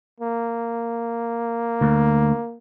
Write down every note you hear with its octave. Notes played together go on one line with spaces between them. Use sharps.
A#3
D2